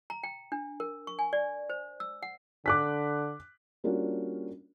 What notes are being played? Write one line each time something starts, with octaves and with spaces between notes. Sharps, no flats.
A#5
G5
D4
A#4
C#6
G#5
D5
C5
E6
F#5
D3 D6 F#6 B6
G3 A#3 C#4 D4 F4 F#4